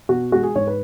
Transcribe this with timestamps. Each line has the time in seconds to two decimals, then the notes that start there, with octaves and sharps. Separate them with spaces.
0.09 B2 F#4
0.32 G#3 F#4
0.43 G#4
0.55 G#2 C#5
0.67 B4